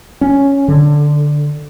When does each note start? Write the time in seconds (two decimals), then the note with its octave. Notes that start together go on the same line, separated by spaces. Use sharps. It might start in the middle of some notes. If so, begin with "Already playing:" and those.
0.21 C#4
0.68 D3